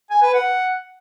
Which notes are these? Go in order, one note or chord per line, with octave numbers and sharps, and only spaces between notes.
G#5
B4
F#5